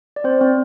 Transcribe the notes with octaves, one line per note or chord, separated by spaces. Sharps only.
D5
C4 C5
C4